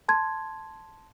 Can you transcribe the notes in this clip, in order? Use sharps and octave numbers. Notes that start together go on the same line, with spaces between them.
A5 C6 G#6